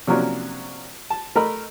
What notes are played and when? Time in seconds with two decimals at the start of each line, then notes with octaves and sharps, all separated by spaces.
0.07 C3 F3 F#3 A#3 C#4 D4
1.10 A5
1.36 A3 A#4 D#5 B5